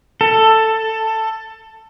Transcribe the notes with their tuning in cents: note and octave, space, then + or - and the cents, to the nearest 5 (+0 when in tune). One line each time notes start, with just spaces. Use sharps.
A4 +10